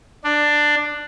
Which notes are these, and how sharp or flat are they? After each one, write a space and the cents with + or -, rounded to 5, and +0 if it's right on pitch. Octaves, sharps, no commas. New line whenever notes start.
D4 +10